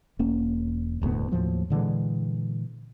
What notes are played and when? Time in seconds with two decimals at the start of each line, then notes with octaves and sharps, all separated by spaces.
0.19 E1 A#3 C#4
1.02 E1 D2 A2 B3
1.32 D#2 A2 F3 F#3
1.70 A#2 D3 E3 G#3